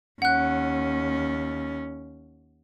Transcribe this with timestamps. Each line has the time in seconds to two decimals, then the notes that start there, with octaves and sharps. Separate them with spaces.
0.22 D#2 C#4 F#5 F#6